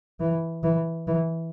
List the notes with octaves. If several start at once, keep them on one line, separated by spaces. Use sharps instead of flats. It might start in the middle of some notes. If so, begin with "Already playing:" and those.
E3
E3
E3